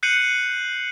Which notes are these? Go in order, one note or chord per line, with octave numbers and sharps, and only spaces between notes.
F#6 G6 C7 C#7 D#7 F#7